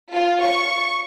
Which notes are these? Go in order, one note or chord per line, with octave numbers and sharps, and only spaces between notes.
F4
C#6